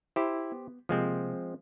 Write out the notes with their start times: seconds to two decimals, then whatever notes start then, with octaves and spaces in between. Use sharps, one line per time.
0.16 E4 G4 C5
0.52 B3
0.89 C3 F3 G#3 A#3 C4